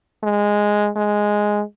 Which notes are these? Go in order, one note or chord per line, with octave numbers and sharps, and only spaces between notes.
G#3
G#3